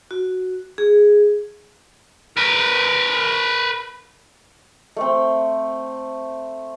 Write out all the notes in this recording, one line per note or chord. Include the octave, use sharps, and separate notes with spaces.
F#4
G#4
A#4 B4
A3 C4